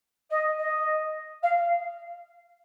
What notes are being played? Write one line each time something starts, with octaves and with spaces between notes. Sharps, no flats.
D#5
D#5
F5